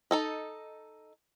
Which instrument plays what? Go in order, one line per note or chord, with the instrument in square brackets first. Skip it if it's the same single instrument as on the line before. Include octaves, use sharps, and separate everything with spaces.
[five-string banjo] D#4 A4 D#5